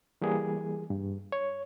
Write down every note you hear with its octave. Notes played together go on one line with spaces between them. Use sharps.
E3 G3 A#3 G#4
G2
C#5